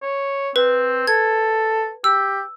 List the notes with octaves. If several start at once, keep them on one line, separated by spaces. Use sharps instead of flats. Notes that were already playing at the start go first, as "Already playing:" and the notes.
C#5
C4 B4
A4 G#6
G4 E6